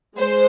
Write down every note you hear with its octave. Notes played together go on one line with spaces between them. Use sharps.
G#3 C5